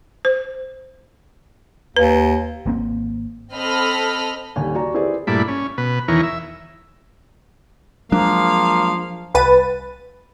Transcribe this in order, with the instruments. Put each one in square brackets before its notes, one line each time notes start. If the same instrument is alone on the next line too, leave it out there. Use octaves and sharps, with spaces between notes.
[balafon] C5
[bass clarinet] D#2 [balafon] B4
[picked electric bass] G#1 A#3 C4
[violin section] C4 A4 D#5 B5 F6
[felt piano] D#1 D#2 D3 G#5
F#4 D5 A#5
C4 E4 G4 G#4 B4 D5
[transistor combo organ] G2 A#2 A3 E4 D5 B5
C#4
B2 B4
E2 D#3 E3 A#4 C#5
E5
[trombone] F3 [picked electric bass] F#3 G#3 D4 [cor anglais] A#3 [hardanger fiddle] F5
[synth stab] C2 B4 A6 D#7